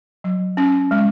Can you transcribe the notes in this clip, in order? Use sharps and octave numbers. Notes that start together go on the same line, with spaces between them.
F#3
C#4
G#3